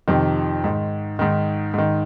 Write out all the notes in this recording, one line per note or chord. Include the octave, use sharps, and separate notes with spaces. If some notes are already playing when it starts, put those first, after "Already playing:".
F2 C3 D#3
G#2 D#3
G#2 D#3
G#2 D#3